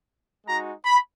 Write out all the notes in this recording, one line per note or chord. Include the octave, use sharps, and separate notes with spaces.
G#3 D#4 F#4 A#5
B5